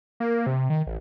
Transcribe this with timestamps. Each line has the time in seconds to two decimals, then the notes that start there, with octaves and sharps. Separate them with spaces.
0.20 A#3
0.47 C3
0.70 D#3
0.87 A1